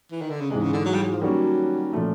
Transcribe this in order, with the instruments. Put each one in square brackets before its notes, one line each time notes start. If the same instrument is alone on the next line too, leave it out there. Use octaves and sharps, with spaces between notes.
[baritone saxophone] E3
D#3
D3
C#3
[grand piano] G#2 E3 G#3 [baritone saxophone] C3
[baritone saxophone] C#3
D3
F#3
G3
F#3
F3
[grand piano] D#3 G3 A#3 C#4 F#4 [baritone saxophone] F#3
[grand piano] A#2 F3 A3 C#4